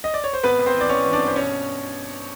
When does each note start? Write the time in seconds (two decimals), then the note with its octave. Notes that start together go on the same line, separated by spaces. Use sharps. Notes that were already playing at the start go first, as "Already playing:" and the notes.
0.04 D#5
0.14 D5
0.24 C#5
0.33 C5
0.43 G#1 B3 B4
0.58 G#1
0.66 C4 C5
0.74 E3
0.81 D5
0.89 G#1 C#4 C#5
1.05 E3
1.13 D4 D5
1.20 G2
1.27 C5
1.35 B2 C#4 C#5